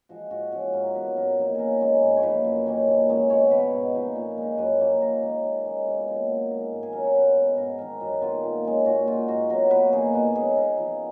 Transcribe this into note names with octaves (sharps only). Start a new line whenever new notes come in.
F3 G#3 F#4
G#2 F#4
F3 G#3 C#4 F#4
G#2 A#4
F#3 B3 B4
F#2 A#4
F3 A#3 D#4
C#3 G#4 A#4
G#3 C#4
G#2
C#5
F3 A#3 D#4 B4
F#2
D#3 A#3 C#4
A#2
F3 G#3 C#4
B2 C#5
F#3 B3 B4
G#2
F3 A#3 D#4
A#2
G#3 D#4
F#2 B4
F3 A#3 C#4
D#3 A#4
G#3 C#4
D#3
G#3 C#4
B2 F4
F#3 A#3 D#4
D#3
G#3 D#4
G#2
G#4
F#3 C#4 A#4
C#5
B2 B4
G#3 B3 D#4
G#2 A#4
D#3 G#3 A#4
F#2 F#4
D#3 G#3 B3 F4
A#2
G#3 C#4
A#2 F#4
G#3 D#4 F4
G#2 F#4
F#3 B3 A#4
A#2 B4
F3 A#3 D#4 G#4
B2 B4
G#3 C#4 G#4
C#3 A#4
F3 B3